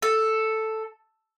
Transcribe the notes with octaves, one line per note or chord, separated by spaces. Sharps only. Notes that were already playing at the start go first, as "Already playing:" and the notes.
A4